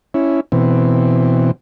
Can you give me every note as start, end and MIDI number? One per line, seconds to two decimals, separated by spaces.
0.14 0.40 61
0.14 0.40 64
0.52 1.51 47
0.52 1.51 52
0.52 1.51 60